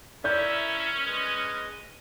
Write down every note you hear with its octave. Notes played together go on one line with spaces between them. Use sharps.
C#4 E4 A#4 D5 E5 G6
G#3 B4 D#5